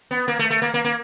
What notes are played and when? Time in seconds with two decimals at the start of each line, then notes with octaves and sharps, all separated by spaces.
0.11 B3
0.28 A#3
0.39 A3
0.50 A3
0.62 A#3
0.74 A#3
0.85 A#3